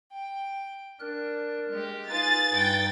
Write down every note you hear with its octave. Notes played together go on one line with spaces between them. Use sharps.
G5
D4 A#4 F#6
G#3 G4
D#4 F4 G#4 B4 F5 A6
G2 F#5 G5